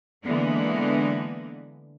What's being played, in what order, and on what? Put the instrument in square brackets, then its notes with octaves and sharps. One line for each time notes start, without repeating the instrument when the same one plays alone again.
[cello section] D3 E3 G#3 A#3 B3